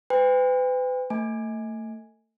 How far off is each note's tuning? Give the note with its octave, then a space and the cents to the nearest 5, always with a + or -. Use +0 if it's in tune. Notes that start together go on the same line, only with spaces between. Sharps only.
B4 +40 G5 +40
A3 +30 G#5 +0